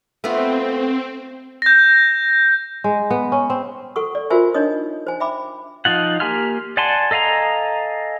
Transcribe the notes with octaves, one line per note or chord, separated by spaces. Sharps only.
A3 B3 C4 F4
G6 A#6
G#3
B3
C#4
C4
A4 F#5 C#6 D#6
D5
F4 F#4 A#4 C5 E5 G#5
D4 D#4 C#5 D#5 D#6
C5 G#5
E5 G5 B5 D6
F3 D#4 F4 F#5
A#3 G4 G#5 C6 F6
D5 F#5 G#5 A5 C6
A4 D#5 F5 G#5 A#5